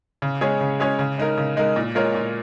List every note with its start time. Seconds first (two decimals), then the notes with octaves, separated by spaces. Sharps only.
0.22 C#3
0.41 G#3 C#4 G#4 C#5
0.60 C#3
0.80 G#3 C#4 G#4 C#5
0.99 C#3
1.18 G#3 D#4 A#4
1.37 C#3
1.57 G#3 D#4 A#4
1.76 A#2
1.95 G#3 F4 A#4 C#5
2.14 A#2